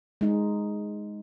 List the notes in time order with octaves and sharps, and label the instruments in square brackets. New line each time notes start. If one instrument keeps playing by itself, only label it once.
[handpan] G#3 D#4